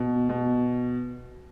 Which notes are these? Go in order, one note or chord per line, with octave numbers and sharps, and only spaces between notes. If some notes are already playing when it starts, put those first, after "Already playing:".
Already playing: B2
B2